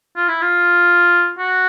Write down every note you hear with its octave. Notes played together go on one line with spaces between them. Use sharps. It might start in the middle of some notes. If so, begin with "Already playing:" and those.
F4
E4
F4
F#4